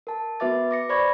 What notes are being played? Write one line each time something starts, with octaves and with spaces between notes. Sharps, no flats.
A#4 A5
B3 F#4 B4 E5 D6 A6
D6 A#6 C#7
C5 D5 B5 C#6 G#6 A#6